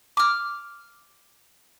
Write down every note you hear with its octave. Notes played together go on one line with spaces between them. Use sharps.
D6 F6